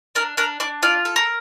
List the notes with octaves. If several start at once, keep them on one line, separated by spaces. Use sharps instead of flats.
D4 A#4
D4 A#4
D4 D5
F4 D5
A4
A#4